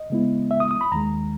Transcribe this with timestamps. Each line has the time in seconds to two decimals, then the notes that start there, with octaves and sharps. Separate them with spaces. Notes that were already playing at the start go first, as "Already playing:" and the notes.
Already playing: D#5
0.10 C#3 G#3 B3 E4
0.51 E5
0.60 D#6
0.71 D#6
0.81 B5
0.92 D#2 D#3 G#3 A#5